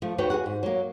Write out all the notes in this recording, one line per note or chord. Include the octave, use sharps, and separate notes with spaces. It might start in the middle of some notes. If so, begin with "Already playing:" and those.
F3 A3
D#2 F#4 B4 C#5 G5
F#4 G#4 A#4 F#5
G#2
F#3 A#3